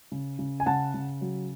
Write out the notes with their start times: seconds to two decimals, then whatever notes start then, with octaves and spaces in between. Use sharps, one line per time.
0.12 C#3
0.39 C#3
0.60 G#5
0.66 C#3 F#5 A5
0.94 C#3
1.21 F#3